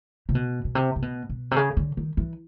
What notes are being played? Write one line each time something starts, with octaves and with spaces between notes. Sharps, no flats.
C3
B2
B2
C3
C3
B2
B2
C3
C#3
D3
D#3
E3